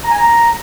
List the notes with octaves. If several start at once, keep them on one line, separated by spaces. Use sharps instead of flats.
A#5
G#5
A#5